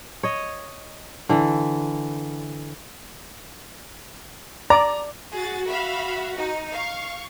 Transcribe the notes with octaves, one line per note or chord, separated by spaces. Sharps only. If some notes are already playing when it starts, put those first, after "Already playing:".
C#5 D#5
D3 E3
D5 A#5
F#4 G#4 A6
E5 F5 B5
D#4
F5 C#6